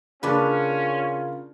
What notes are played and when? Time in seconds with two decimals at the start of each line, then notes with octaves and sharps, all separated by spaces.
0.23 C#3 A#3 C#4 D4 F4 B4